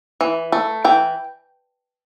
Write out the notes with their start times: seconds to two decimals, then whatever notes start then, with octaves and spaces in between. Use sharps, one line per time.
0.21 E3
0.52 A3
0.85 E3 G5